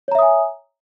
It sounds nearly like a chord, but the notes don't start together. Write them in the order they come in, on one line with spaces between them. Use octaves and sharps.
C#5 A#5 E5 D#6 G#5